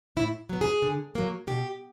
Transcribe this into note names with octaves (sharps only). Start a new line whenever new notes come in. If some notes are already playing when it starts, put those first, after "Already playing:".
A2 E4
F#3 B3
G#4
D3
F#3 A#3
B2 G4